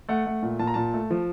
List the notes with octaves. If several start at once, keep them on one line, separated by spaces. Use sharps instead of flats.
A3 F#5
A3
A#2
A#2 A5
A#5
A#2 A5
A3
F3